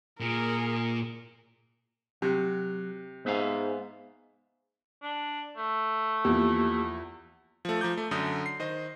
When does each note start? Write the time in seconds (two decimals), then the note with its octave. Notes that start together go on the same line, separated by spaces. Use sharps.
0.20 A#2 G#4 A#4
2.22 C3 F#3
3.26 G#2 B3 E5 F5
5.02 D4
5.57 A3
6.25 E2 F3 A#3 G4
7.65 F3 A3
7.81 F3 A#5 D6 G6
7.97 A3
8.11 F#2 D3 D#6 G6
8.46 C7
8.60 D#3 C5 D#5